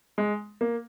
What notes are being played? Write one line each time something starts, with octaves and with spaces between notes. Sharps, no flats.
G#3
A#3